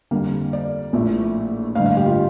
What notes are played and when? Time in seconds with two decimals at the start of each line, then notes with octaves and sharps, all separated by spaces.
0.11 F2 D3 G3 A#3
0.53 D5
0.93 A#1 A2 F3 A3
1.75 A1 F5
1.78 G2 D3
1.86 F5
1.97 G4
2.06 F4